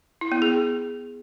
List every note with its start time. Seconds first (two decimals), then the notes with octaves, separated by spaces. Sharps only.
0.21 E4
0.32 B3
0.42 G#4